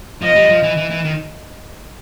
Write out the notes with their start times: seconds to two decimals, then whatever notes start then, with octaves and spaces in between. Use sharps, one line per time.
0.22 F3 D#5
0.36 G3
0.49 F3
0.63 E3
0.77 E3
0.90 E3
1.05 D#3